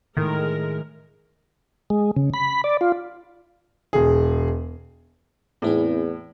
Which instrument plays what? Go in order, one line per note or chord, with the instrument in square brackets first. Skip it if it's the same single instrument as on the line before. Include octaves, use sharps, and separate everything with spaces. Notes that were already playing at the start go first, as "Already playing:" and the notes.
[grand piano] A2 [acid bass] D#3 [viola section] G#3 A#4
[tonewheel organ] G#3
C#3
B5
D5
F4
[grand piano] E1 G#4
[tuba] E2 [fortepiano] A2 [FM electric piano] C4 E4 G#4